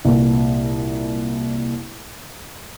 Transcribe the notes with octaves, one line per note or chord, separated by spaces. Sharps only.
C2 A#2